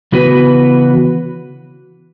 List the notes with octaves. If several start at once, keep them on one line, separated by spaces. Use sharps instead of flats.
C#3 E3 B3 F#4 B4